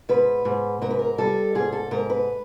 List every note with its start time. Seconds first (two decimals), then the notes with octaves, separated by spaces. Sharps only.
0.09 G#2 B4
0.45 G#2
0.82 G#2 A#4
0.91 B4
0.99 A#4
1.18 G3 A4
1.55 G#2 G#4
1.72 A4
1.91 G#2 A#4
2.10 B4